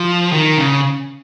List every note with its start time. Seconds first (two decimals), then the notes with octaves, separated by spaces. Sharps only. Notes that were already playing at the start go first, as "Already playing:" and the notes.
Already playing: F3
0.32 D#3
0.58 C#3